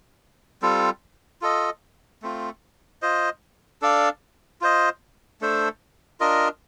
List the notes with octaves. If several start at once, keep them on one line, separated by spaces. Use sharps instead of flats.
G3 C4 F4 A4
F4 A4 D#5
A3 C4 F4
F4 C5 D#5
D4 A4 D5 F5
F4 C5 D#5
A3 D4 A4 C5
D4 F4 A#4 D#5